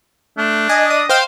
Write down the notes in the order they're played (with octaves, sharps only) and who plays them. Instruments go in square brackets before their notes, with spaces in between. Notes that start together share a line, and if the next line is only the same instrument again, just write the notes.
[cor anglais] A3 [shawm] D4
[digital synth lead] D#5 [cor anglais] G#5
[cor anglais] D5 [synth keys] D#6
[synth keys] C5 F5 [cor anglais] G5